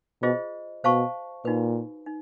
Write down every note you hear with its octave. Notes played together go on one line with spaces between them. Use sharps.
B2 F4 G#4 C5 D#5
B2 C5 F5 A5 C#6
A#2 D#4 F#4 B4
D#4